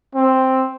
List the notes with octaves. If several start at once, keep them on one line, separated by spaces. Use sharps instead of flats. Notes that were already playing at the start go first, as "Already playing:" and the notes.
C4